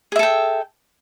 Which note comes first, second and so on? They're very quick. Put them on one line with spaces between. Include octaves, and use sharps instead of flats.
G#4 E5 A4 G5